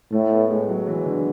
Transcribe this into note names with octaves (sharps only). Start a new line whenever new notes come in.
A2 A3
B3
G#3
F#3
E3
D3